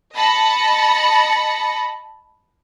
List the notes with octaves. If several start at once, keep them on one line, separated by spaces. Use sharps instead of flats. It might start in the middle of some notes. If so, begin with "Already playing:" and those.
D#5 A5 B5 A#6 C#7